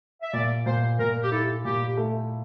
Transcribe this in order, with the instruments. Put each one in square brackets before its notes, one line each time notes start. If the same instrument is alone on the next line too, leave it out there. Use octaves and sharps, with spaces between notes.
[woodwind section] E5
[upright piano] A#2 [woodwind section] D5
[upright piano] A#2 [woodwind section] C5
[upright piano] A#2 [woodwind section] A#4
[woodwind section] G4
[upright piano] E4 [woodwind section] A4
[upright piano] A#2 [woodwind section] G4
[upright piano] A3